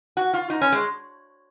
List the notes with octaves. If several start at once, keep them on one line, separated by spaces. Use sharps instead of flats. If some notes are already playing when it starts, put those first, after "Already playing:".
F#4
F4
D#4
C#4
G#3